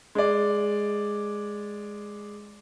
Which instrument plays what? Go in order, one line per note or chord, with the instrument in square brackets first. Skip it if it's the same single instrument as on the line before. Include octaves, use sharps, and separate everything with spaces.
[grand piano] G#3 D5